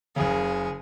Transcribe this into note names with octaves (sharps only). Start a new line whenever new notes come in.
F#1 C#3 G#4